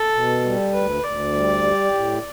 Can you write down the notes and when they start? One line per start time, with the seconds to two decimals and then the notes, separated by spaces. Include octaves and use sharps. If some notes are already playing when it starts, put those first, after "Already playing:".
Already playing: A4
0.14 B2
0.44 G3
0.73 D2 B4
1.03 D2 D5
1.33 G3
1.63 G4
1.94 A2